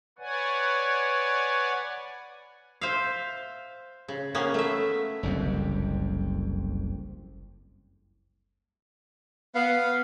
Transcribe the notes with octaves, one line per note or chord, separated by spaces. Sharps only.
B4 C#5 D5 F#5 G#5
C5 E5 F5
C#3
A#3 B3 C#4 G#4
A3 E5
F#1 C2 F2 C3
B3 F5